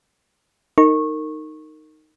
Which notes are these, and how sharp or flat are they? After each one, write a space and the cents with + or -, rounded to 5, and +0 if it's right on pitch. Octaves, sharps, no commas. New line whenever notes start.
D#4 +0 A#4 -25 C#6 -20